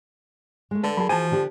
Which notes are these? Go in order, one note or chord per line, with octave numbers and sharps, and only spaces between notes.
G#3 A3
D3 A4 B4
F#3 G#4 A#4 A5 B5
E3 F3 F#4 G#4 G#5 A5
D3 D4 G4